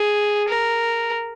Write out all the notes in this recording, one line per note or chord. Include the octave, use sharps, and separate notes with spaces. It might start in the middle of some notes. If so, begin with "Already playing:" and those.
Already playing: G#4
A#4